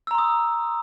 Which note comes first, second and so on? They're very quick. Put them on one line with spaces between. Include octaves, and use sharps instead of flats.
E6 A#5 C6 D#6